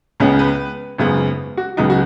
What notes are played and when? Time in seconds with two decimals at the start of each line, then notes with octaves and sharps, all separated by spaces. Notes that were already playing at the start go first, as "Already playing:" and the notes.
0.20 C#2 C#3 B3 C#4
0.39 B4
0.98 G#1 F#2 C#3 B3
1.57 F#4
1.77 C#2 C#3 F#3 B3 D#4
1.90 F#4